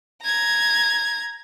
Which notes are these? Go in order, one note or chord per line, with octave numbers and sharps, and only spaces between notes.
A#5 G#6